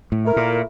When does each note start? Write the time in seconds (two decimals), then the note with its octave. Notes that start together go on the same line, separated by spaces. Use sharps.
0.12 A2
0.25 A3 E4 A#4
0.36 A#2